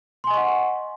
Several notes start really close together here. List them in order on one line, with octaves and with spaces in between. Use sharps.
C6 G#5 D#5 C#6 F#5